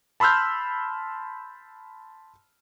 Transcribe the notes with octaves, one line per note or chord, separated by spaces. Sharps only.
A5 B5 C6 E6 F6 G6